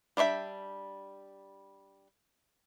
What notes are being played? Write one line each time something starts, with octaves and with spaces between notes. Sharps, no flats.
G3 D4 C#5 E5 G5